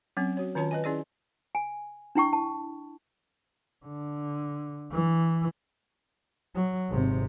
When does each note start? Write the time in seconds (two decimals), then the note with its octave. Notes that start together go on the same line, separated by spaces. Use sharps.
0.17 F#3 C4 C#4
0.37 F#4 C#5
0.55 D#3 C#4 F4 C#5 A5
0.71 B4 D#5 G#5
0.84 C#4 E4 G#4 D5
1.55 G#5
2.15 D4 E4 G5 C#6
2.33 A5
3.86 D3
4.92 E3
6.55 F#3
6.89 G#1 C3